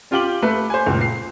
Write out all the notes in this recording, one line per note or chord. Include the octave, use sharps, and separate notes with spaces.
C#4 F4 G4 G5 D6 F#7
A3 B4
C5 G#5
C#2 A#2
C7